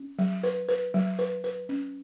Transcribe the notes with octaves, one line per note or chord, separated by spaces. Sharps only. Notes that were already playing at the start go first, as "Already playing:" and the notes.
Already playing: C#4
F#3
B4
B4
F#3
B4
B4
C#4